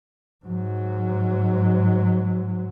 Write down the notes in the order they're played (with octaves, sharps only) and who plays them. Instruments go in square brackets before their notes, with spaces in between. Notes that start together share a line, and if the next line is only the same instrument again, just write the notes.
[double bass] G#2 F#3